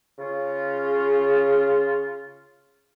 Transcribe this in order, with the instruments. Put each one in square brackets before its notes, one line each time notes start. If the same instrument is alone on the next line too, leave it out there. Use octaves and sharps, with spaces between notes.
[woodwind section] C#3 F4